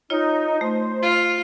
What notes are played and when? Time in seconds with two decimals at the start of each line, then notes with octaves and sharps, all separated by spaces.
0.10 D#4 F4 C#5 D#5
0.61 A3 C5
1.03 F4